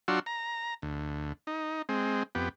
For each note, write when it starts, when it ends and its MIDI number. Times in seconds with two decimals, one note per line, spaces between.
0.08 0.19 54
0.08 0.19 62
0.08 0.19 65
0.08 0.19 66
0.08 0.19 84
0.08 0.19 88
0.26 0.74 82
0.82 1.33 38
1.47 1.82 63
1.89 2.23 56
1.89 2.23 60
2.35 2.49 41
2.35 2.49 59
2.35 2.49 67